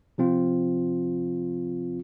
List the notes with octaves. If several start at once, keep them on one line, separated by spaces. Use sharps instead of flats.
C3 F3 C4 F4